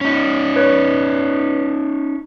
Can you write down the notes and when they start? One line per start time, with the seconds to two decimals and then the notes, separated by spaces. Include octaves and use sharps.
0.01 C#4 D#4
0.56 B4 C#5